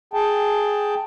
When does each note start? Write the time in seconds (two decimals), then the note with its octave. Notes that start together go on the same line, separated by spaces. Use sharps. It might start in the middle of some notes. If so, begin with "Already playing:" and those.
0.13 G#4 G5 A5